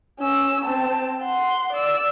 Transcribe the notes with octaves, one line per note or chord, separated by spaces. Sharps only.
C#4 E6
C4 A5
F#5 C6
D5 E6